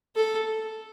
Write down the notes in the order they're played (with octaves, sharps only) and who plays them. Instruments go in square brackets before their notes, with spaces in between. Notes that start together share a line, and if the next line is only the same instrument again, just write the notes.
[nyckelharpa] A4